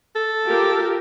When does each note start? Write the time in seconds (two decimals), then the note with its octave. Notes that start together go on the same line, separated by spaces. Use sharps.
0.15 A4
0.46 F4 G4 A#4